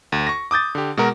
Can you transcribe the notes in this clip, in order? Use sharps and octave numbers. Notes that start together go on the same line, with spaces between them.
D2
C#6 A#6
D6 D#6 G6 A6
D3 G4
B2 G#3 F#4 A#4